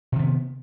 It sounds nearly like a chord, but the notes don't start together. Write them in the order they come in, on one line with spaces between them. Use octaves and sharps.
C3 D#3 B3